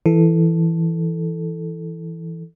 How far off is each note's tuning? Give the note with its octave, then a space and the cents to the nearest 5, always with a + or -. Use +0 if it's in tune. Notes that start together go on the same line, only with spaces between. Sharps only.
E3 +0 A4 +0